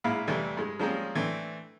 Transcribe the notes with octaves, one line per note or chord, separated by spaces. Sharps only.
A#1 G#2 A#3 E4 F5 B5
F2 C3 E3 G3 A3
G2 G#3
F3 G3 G#3 A#3 C4 C#4
E3 A3 C4 D4